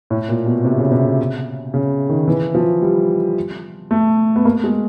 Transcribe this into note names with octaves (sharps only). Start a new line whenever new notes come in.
A2
A#2
B2
C3
C#3
C3
C#3
D#3
E3
F3
G3
A3
B3
A#3
G#3